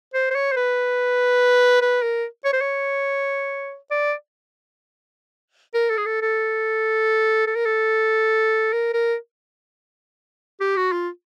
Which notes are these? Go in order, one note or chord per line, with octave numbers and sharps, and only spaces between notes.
C5
C5
C#5
C5
B4
B4
A#4
C#5
C5
C#5
D5
A#4
A4
G#4
A4
A4
A4
A#4
A4
A#4
A#4
G4
F#4
F4